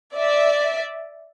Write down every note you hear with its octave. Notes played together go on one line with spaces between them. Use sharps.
D5 E5